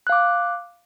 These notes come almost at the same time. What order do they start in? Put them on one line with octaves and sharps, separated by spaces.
F#6 F5 D6